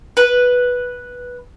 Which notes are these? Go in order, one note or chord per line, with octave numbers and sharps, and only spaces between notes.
B4